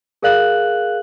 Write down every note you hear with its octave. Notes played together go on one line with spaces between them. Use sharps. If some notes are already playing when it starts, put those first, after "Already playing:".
G#4 A#4 D5 F5 F#6 F#7